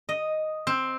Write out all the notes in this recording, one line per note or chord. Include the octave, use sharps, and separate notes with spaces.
D#5
C4